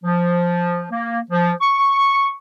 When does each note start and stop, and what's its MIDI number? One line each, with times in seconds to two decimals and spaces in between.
0.04 0.86 53
0.92 1.20 58
1.30 1.51 53
1.60 2.32 85